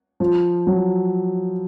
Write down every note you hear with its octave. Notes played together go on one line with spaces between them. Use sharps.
F3
F#3